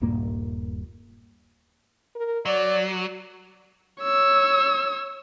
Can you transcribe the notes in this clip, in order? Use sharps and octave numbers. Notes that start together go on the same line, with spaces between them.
D#1 G2 A#2 A#3
A#4
F#3 D5
C#5 E6